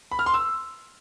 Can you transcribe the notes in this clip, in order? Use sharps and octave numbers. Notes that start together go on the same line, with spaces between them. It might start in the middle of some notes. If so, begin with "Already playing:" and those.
B5
F6
C6
E6